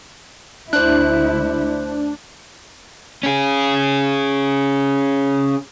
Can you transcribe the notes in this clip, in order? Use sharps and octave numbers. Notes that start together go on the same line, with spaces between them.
D2 D4 E4 C5 F#6
C#4 G#4